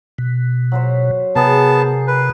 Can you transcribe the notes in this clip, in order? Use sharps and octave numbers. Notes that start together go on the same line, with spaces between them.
B2
F#3 F#4 C5
C3 B3 G#4 A#4 A5
B4